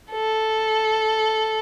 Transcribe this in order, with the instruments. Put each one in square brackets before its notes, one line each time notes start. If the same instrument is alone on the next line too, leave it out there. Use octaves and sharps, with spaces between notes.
[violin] A4